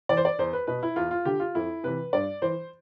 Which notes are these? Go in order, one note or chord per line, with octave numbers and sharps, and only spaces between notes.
E3 D5
C5
D5
E2 C5
B4
B2 B4
E4
E2 F4
F4
D3 G4
F4
F2 E4
C3 E3 B4
G2 D5
E3 C5